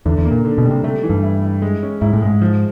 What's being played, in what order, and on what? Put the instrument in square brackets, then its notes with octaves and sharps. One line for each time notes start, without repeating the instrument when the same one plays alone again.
[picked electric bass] E2 [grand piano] D3
[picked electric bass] E2
[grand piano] A#3
[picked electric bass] A#2
[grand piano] D3
[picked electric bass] B2
[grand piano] G3
[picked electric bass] C3
[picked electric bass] C3 [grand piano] A3
[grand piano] E3
[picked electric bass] G2
[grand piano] E4
E4
G#3
C#4
[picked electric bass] G#2 [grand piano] E4
[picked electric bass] A2
[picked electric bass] G#2 [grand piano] G#3
[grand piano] F3